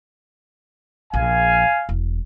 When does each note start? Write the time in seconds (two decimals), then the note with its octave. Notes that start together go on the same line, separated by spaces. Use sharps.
1.14 A#1 F5 G#5
1.89 E1